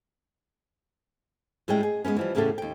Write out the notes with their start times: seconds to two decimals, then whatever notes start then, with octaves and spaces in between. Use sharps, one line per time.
1.68 A2 G3 G#3 C#4 G5
1.83 G#4
2.04 G#3 A3 B3 C#4
2.16 E3 F3 G3
2.35 E2 A2 C#3 C#4 G4 A4
2.58 D#2 G5